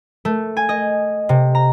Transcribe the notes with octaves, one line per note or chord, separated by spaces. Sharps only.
A3
G#5
D#5
C3
A#5